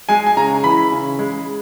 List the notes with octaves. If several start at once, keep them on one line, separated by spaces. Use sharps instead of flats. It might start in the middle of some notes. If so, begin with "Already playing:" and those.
G#3 G#5
G#5
C#3 A#5
E3 B5
C#3
G#3